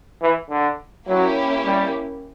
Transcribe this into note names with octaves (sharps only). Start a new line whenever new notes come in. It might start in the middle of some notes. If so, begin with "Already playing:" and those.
E3
D3
F#3 A#3 C#4 E4 G4
G3